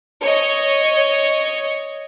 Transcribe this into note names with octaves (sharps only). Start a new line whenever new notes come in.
C#5 D#5